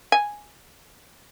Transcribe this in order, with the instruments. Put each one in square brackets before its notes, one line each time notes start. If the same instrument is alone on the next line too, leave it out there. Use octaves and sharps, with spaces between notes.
[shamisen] G#5